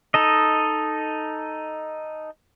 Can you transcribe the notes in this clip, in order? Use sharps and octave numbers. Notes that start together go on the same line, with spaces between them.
D#4 A4 D#5